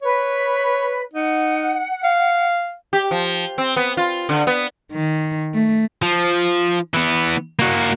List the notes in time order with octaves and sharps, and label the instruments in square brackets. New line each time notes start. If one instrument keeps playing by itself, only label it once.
[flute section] B4 [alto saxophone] C#5
[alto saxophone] D#4 [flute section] F#5
[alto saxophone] F5
[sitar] G4
F3
C4
B3
F4
D3
B3
[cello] D#3
A3
[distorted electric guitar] F3
E3 B3
A#3 F#4